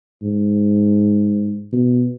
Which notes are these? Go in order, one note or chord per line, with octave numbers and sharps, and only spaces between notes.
G#2
B2